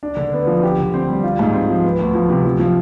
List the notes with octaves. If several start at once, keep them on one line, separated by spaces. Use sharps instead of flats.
D4
D3
B3
F3
G4
D3
C4
G3
F4
G#2
C4
F3
B3
D2
F3
C3
F3
F3